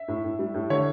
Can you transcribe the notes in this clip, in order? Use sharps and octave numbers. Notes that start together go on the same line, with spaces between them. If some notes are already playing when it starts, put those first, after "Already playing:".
Already playing: E5
A2
A2
G3
A2
D3 C#5